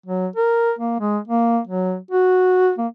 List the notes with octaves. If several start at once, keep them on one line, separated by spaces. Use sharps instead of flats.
F#3
A#4
A#3
G#3
A#3
F#3
F#4
A#3